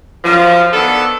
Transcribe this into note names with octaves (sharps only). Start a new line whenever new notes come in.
F#2 F3
D#3 B3 D4 A4